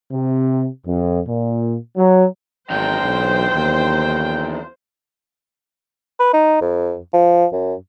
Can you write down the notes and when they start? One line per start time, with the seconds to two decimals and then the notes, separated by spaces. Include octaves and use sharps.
0.12 C3
0.85 F2
1.28 A#2
1.97 F#3
2.70 G#1 E2 F#3 C5 G5
3.02 B1
3.52 D#2
6.20 B4
6.33 D#4
6.61 F2
7.13 F3
7.52 F#2